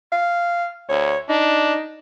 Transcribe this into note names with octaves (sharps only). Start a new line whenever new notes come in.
F5
D2 C#5
D4 D#4